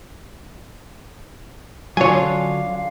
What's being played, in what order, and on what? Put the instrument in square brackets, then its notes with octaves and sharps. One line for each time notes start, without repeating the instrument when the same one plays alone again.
[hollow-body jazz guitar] D3 F#3 [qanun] C#4 D4 F4 [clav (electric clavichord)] C#5 G#5 [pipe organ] F5